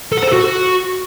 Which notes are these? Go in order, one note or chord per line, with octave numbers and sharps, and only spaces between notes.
A4
F#5
C5
A4
F#4